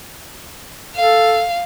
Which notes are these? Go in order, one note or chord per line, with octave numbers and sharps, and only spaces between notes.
A4 F5